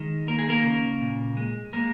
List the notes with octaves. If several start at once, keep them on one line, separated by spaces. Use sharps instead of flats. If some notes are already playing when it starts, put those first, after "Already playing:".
Already playing: D#3 G#3
A#3 A#4
G#4
A#3 A#4
C#3
A#2
G#3
G#3 A#3 A#4